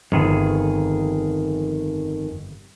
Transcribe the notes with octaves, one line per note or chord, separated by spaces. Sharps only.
G1 F2 D#3 G#4